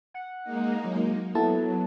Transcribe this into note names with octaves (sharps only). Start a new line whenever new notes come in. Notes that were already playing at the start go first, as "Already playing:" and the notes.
F#5
G#3 A#3 D#4
F#3
F#3 B3 E4 A4 A5